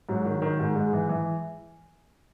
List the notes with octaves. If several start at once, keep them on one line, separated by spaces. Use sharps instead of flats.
G#2 F#3
D#3
D#3
G#2
G#2 G#3
E3
E3